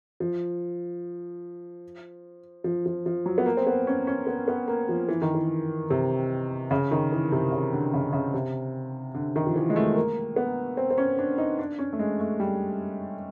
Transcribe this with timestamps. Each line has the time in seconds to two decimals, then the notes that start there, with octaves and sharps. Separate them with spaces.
0.20 F3
2.64 F3
2.86 F3
3.06 F3
3.26 F#3
3.38 B3
3.46 A#3
3.57 C4
3.67 B3
3.87 C#4
4.07 C#4
4.27 B3
4.48 B3
4.68 A#3
4.89 F3
5.08 E3
5.22 D#3
5.35 E3
5.90 C3
6.71 C#3
6.91 D#3
7.12 E3
7.32 C3
7.52 C#3
7.73 D3
7.94 C#3
8.13 C#3
8.34 C3
9.14 D3
9.36 D#3
9.46 F3
9.56 E3
9.70 G#3
9.76 A3
9.96 A#3
10.36 B3
10.77 C4
10.90 C4
10.98 C#4
11.19 D4
11.38 D#4
11.59 D4
11.79 C#4
11.93 A3
11.99 G#3
12.20 A3
12.40 G3